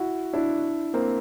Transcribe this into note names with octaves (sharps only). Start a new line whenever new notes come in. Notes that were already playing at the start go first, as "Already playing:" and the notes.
Already playing: E4 F#4
D4 E4
A#3 C4